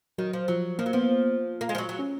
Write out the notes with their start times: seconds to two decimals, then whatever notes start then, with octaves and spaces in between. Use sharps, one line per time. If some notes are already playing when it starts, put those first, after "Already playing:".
0.18 D#3 F#3
0.33 F3
0.48 F3 F#3
0.79 F3 A#3
0.86 F#3
0.93 F3 B3
1.61 A#3
1.69 G#3
1.75 F3
1.78 F#3
1.89 F#3
1.99 C#4